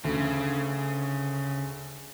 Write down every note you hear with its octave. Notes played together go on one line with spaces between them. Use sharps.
D2 C#3